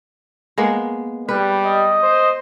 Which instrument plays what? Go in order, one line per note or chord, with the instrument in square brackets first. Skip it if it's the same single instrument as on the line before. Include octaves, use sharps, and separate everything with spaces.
[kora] G#3 A#3 B3
[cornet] G3 [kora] B4
[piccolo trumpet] D#5
[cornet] C5